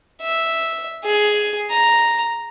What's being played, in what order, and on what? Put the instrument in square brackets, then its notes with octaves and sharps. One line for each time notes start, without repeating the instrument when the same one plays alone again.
[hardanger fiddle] E5
G#4
A#5